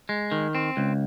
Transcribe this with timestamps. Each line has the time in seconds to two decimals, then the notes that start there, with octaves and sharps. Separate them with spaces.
0.09 G#3
0.32 D#3
0.55 C4
0.77 C#2